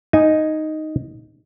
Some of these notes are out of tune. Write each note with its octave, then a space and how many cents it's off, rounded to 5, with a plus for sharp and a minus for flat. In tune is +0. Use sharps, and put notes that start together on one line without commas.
D#4 +0 G#5 +0